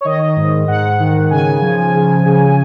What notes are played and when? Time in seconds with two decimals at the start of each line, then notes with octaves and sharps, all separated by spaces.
0.01 C#5
0.05 D#3 D#5
0.36 G#2
0.68 G#2 F#5
1.00 D#3
1.30 C#3 G#5
1.62 F3
1.94 C#3
2.26 C#3